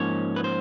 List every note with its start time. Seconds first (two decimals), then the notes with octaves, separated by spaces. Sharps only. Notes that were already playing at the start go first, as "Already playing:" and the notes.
Already playing: G#2 F3 A#3 C#4 C#5
0.36 B4
0.44 C5